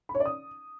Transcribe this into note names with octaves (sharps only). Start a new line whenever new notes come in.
B5
C#5
D5
D#6